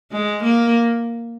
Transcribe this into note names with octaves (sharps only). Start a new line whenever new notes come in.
G#3
A#3